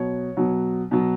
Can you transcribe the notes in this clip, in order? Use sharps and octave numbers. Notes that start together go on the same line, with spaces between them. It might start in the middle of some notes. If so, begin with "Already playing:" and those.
Already playing: B2 F#3 C#5
B2 F#3
B2 F#3